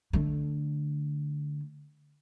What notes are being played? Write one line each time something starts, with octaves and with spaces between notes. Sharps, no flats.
D3 A3